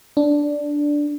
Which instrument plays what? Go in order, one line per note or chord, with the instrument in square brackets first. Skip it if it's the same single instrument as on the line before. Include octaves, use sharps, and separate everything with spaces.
[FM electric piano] D4